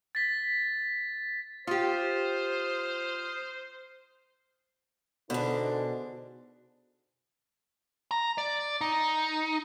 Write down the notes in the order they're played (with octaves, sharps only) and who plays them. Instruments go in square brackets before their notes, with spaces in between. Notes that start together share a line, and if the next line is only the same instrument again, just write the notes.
[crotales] A6 B6
[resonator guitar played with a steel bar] F4 G4 [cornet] C5 [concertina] D#6 F6
[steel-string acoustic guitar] B2 D4 [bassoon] D3 [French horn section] D#4 G#4 C5
[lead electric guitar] A#5
D5
D#4